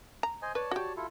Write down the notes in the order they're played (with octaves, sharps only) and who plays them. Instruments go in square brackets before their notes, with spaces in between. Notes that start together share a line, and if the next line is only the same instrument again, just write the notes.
[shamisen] A#5
[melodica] C5 D#5 G#5
[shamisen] B4 [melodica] C#5 D5 A5
[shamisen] F#4 G4
[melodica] E4 F4 A4